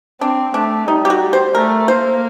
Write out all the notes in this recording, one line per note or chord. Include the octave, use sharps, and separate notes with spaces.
C4 D4
A3 D4
G3 D#4
G4
F#4
C5
A3 A#4
A#3 C5